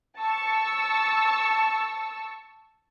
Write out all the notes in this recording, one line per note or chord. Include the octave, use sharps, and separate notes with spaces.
A5 C#6 E6